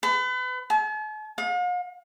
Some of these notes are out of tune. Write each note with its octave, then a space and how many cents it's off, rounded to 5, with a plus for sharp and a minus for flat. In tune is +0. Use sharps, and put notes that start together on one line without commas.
B4 +35
A5 -45
F5 +45